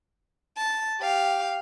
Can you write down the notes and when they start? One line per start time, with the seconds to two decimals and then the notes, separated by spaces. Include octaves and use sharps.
0.57 A5
1.01 G4 F5